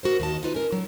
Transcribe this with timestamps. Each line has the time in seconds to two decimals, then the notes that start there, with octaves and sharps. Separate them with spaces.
0.03 F#4 A#4 C5
0.20 D#2 D#5 A5
0.43 D#4 F4 B4
0.54 C#4 A#4
0.72 F#3